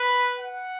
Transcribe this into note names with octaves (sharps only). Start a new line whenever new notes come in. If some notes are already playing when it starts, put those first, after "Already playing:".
Already playing: B4
F#5